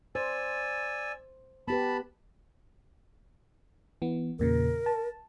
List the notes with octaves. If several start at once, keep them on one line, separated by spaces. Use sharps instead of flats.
C5 D5 G#5 E6
B3 G4 B4 A5 B5
E3 B3
E2 A#2 C#3 A#4
A5